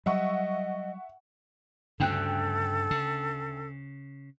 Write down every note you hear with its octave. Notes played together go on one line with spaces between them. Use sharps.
F#3 G3 D#5 E5 F#5 C#6
D2 G2 C#3 A4 G5 F#6
C#3